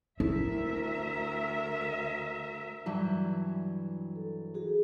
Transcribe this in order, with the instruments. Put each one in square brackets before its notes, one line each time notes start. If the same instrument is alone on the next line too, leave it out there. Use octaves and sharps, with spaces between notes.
[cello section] D2 A#4 E5 [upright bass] E4
[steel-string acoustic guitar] G2 E3 F#3
[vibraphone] A4
F#4 G#4